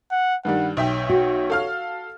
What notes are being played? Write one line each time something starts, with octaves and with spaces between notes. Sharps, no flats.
F#5
G2 D#3 G3 F#5
B1 C#5 E5 G5
F#4
A4 F5 F6